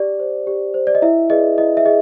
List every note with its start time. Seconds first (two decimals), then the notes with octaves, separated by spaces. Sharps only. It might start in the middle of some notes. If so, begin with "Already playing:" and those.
Already playing: G4 D5
0.20 C5
0.47 G4
0.74 C5
0.87 D5
0.95 D#5
1.02 E4 E5
1.30 G#4 B4 D5 D#5
1.58 E4 D#5
1.77 E5
1.85 G#4 D#5